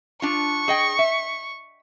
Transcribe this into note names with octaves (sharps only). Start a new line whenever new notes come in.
D4 F4 C#6
G#4 D#5 G5
E5